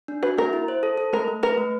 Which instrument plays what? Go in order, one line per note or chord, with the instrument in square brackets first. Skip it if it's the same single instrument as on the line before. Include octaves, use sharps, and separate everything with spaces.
[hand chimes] D4
[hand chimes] F#4 [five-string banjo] B4
[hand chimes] A#3 [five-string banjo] A#4
[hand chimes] E4
C5
A4
A4
[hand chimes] A3 [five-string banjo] A#4
[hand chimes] A3
[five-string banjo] A#4 [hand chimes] B4
[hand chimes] A3